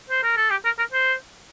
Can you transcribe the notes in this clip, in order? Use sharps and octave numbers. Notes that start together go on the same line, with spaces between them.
C5
A#4
A4
G4
A#4
A#4
C5